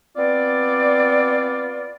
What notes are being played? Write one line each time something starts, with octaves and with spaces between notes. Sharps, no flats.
B3 C4 F4 D5